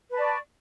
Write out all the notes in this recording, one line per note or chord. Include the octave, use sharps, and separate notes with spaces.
B4 D5 A5 C#6